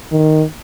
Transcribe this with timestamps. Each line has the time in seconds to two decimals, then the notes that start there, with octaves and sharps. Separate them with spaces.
0.12 D#3